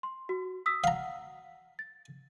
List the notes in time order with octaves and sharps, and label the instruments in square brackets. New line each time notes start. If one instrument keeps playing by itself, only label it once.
[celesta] C6
F#4
D#6 E6 B6
[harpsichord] F5 A#5 [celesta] F#5
[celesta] A6